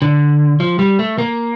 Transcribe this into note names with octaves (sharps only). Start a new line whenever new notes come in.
D3
F3
G3
A3
A#3